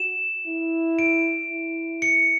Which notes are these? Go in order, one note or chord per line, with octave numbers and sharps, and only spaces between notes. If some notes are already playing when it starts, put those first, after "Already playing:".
Already playing: F#4 E7
E4
D7
E4
C#7